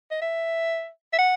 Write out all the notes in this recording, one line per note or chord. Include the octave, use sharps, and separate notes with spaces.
D#5
E5
E5
F#5